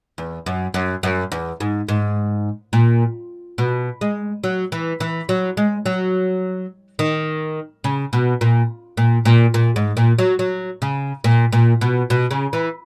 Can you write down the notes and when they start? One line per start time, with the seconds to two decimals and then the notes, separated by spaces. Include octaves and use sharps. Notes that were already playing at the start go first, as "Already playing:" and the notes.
0.18 E2
0.46 F#2
0.74 F#2
1.03 F#2
1.32 E2
1.60 G#2
1.88 G#2
2.73 A#2
3.58 B2
4.01 G#3
4.44 F#3
4.72 E3
5.00 E3
5.29 F#3
5.57 G#3
5.86 F#3
6.99 D#3
7.84 C#3
8.13 B2
8.41 A#2
8.97 A#2
9.25 A#2
9.54 A#2
9.76 G#2
9.97 A#2
10.19 F#3
10.39 F#3
10.82 C#3
11.24 A#2
11.52 A#2
11.81 B2
12.10 B2
12.31 C#3
12.53 E3